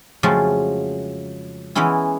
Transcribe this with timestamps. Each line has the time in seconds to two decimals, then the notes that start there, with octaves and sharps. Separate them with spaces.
0.23 F2 C#3 F3 F#3 G#3 A3
1.75 E3 G#3 B3 C#4 E4